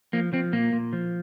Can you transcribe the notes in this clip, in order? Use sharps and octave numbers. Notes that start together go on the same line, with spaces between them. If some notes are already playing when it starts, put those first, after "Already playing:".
F3 A#3
F3 C4
A#2 A#3
A#2
F3